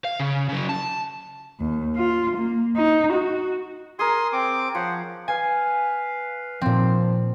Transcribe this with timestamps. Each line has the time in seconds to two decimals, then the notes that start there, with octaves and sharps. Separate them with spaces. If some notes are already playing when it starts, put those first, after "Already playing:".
0.04 F5
0.20 C#3
0.49 C#3 F#3
0.69 A5
1.60 D#2
1.96 F4
2.37 A#3
2.77 D#4
3.14 F#4
3.99 G#4 A#4 C6 D#6
4.33 C4 D6
4.75 F3 C5 C#5 F#5
5.28 B4 F5 G#5
6.61 A#2 F3 C4